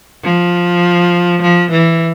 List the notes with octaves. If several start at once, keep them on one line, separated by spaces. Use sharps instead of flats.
F3
F3
E3